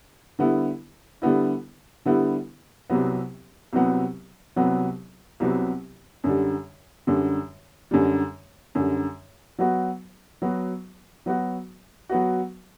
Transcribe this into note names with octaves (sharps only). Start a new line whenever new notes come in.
D3 G3 B3 E4
D3 G3 B3 E4
D3 G3 B3 E4
C2 C3 F#3 B3
C2 C3 F#3 B3
C2 C3 F#3 B3
C2 C3 F#3 B3
F#2 D3 G3
F#2 D3 G3
F#2 D3 G3
F#2 D3 G3
F#3 B3 F#4
F#3 B3 F#4
F#3 B3 F#4
F#3 B3 F#4